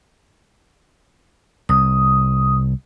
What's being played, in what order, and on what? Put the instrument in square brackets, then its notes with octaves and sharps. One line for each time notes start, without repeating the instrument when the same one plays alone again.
[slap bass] C2 [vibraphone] D#6